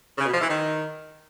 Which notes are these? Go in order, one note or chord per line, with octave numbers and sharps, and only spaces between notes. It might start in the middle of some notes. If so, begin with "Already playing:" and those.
C#3
B2
F3
E3
D#3